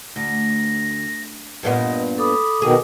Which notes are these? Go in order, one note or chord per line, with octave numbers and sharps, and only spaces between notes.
D2 A#6
G2 A#2 B3 D#5
A4 B5 D6 D#6
B2 D#3 G#4 A#4